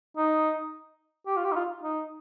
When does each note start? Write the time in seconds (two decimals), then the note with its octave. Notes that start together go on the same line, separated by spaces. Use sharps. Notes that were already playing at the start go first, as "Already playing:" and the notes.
0.17 D#4
1.27 G4
1.37 F4
1.45 G4
1.52 D#4
1.56 F4
1.83 D#4